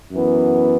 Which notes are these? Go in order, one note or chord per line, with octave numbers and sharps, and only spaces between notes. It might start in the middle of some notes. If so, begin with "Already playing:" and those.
F#2 E3 B3